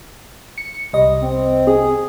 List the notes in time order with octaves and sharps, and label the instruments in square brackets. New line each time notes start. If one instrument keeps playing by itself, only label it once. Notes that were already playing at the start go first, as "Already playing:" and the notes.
[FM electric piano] C#7
C2 D#5
[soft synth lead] C4
G#4